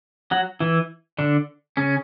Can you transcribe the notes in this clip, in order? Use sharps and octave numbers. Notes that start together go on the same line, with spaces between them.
F#3 F#4
E3 E4
D3 D4
C#3 C#4